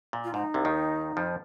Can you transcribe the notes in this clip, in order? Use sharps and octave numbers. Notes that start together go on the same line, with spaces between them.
A#2
F4
G#2 D#4
C2 C3
D#2 D#3
F2 F3